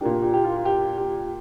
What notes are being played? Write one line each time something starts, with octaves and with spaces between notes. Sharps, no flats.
A#2 A#3 D4 G4
G4
G4
F4
G4
G4